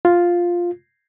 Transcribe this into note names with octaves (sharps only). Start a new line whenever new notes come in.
F4